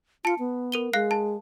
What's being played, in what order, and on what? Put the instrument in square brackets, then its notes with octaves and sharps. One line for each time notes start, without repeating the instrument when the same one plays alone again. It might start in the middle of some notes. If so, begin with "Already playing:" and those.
[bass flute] F4 [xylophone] A5 C#7
[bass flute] B3
[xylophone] A#4 D#7 G7
[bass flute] G#3 [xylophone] F5 F#6 C7
[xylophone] A5